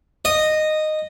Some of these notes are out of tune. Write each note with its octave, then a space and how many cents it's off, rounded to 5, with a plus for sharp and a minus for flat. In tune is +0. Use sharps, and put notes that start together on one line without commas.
D#5 -10